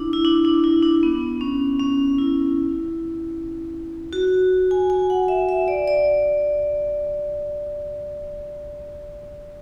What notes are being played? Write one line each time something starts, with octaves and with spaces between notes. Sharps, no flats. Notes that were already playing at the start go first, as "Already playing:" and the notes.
Already playing: D4 E4
E4
D4
D4
E4
D4
B3
C#4
C#4
E4
F#4
G#5
G#5
F#5
E5
E5
D5
D5